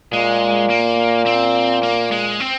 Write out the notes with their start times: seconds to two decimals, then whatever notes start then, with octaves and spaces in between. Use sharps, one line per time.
0.13 A#2 G#3
0.70 A#3
1.26 C4
1.83 A#3
2.12 G#3
2.40 C4